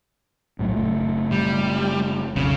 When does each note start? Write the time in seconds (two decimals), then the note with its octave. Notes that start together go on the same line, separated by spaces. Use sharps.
0.59 A#1 A2 F#3
0.76 F#1 A3
1.32 G3
2.36 B1 F2 C#3